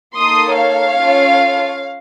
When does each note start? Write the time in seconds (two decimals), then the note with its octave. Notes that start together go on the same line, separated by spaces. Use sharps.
0.17 A#3 D#4 A4 C6 D#6
0.57 C#5 F5
0.97 C#4 F4 A4